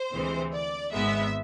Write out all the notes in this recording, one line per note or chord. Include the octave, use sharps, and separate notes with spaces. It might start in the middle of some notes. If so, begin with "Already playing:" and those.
Already playing: C5
D2 C3 E3 G#3 C4
D5
G#1 G#2 G#3 B3 E5